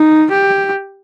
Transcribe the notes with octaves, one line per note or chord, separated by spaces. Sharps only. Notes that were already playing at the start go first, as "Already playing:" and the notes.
Already playing: D#4
G4